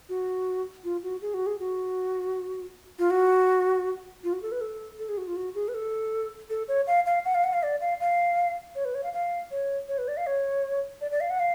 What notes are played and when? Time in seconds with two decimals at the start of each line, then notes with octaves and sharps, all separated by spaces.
0.09 F#4
0.84 F4
1.03 F#4
1.22 G#4
1.34 F#4
1.47 G#4
1.60 F#4
2.99 F4
3.10 F#4
4.24 F4
4.33 F#4
4.42 A4
4.52 B4
4.61 A4
4.99 A4
5.09 G#4
5.17 F#4
5.27 F4
5.36 F#4
5.55 G#4
5.68 B4
5.74 A4
6.50 A4
6.68 C#5
6.87 F5
7.06 F5
7.25 F#5
7.35 F5
7.44 F#5
7.53 F5
7.63 D5
7.81 F5
8.01 F5
8.75 C#5
8.85 B4
8.95 C#5
9.03 F5
9.13 F5
9.51 C#5
9.89 C#5
9.98 B4
10.08 D5
10.17 F5
10.27 C#5
11.01 D5
11.11 D5
11.21 F5
11.30 F#5
11.40 F5